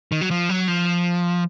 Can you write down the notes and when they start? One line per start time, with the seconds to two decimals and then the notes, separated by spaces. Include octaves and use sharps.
0.12 D#3
0.21 F#3
0.31 F3
0.49 F#3
0.68 F3